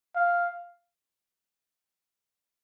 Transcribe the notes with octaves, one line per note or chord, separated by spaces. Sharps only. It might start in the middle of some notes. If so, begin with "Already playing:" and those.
F5